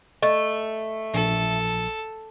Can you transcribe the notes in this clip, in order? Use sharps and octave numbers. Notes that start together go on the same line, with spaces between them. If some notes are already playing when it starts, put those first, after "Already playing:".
A3 D#5
A#1 A4